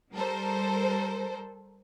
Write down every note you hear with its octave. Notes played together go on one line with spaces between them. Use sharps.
G3 A4 A#4 C5